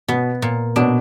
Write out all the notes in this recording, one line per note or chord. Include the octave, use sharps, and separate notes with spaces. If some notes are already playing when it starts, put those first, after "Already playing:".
B2 B3
A#2
B2 D4